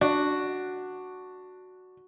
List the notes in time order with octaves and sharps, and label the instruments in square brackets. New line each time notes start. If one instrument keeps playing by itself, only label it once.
[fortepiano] D4 [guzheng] F#4